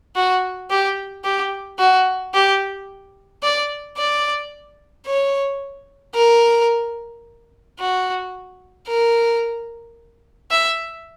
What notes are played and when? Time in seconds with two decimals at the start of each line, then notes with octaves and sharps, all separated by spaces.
0.16 F#4
0.70 G4
1.24 G4
1.79 F#4
2.34 G4
3.43 D5
3.97 D5
5.06 C#5
6.15 A#4
7.79 F#4
8.87 A#4
10.51 E5